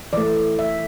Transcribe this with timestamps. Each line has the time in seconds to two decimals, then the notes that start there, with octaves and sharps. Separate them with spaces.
0.13 E3 A3 D5
0.59 E5